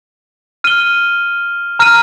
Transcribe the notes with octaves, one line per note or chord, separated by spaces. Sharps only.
F6 D#7 G7
A#5 F6 D#7